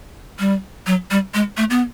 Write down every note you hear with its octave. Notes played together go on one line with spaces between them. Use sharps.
G3
F#3
G3
G#3
A3
B3